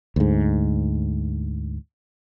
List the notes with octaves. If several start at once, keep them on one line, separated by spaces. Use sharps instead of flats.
D2 G#2